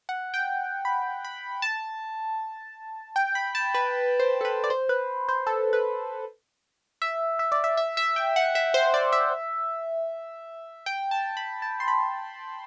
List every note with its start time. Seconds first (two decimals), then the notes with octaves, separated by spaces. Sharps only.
0.09 F#5
0.34 G5
0.85 B5
1.25 B5
1.62 A5
3.16 G5
3.35 B5
3.55 A5
3.74 B4
4.19 C5
4.41 A4
4.45 B4
4.64 D5
4.70 C5
4.89 B4
5.29 C5
5.47 A4
5.73 B4
7.02 E5
7.39 E5
7.52 D5
7.64 E5
7.77 E5
7.97 E5
8.16 G5
8.36 F#5
8.55 E5
8.74 C5
8.94 D5
9.13 E5
10.86 G5
11.11 A5
11.37 B5
11.62 A5
11.80 C6
11.88 B5